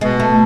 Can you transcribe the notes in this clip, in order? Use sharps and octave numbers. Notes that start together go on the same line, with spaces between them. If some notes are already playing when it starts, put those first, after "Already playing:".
B2 G#3
A3